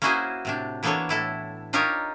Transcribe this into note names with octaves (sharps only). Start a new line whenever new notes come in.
A#3 C#4 E4 F#4 G#4 C5
A2 C3 D4
E3 A#3 B3 D4 A4 C#5
A2 E4 A4
D4 D#4 F4 G4 A#4 C#5